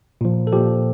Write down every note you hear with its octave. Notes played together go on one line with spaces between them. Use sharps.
A#2 F3
A4
A#2 F3 G4